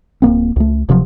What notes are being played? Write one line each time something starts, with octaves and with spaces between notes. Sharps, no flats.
D1 A#2 A#3 C4
C#2 A3
D1 C3 F3 F#3